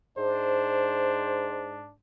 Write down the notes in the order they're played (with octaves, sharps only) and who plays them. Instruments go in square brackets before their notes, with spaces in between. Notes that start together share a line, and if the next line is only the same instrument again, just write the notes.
[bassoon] G#2 [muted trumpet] D4 [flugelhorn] C5